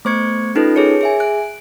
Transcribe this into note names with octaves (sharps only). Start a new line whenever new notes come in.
A3 B3 C5 C#6 G#6 C#7
C#4 D#4 F4 A4 B4
G#4 A#4 C#5 C#7
G#4 E5 G#5
F#6 D7